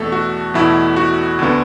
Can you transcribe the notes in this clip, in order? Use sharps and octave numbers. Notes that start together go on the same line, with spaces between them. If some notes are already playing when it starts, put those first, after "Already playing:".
Already playing: E2 B2 A3 A4
F#4
E2 B2 A3 E4
F#4
D2 D3 B3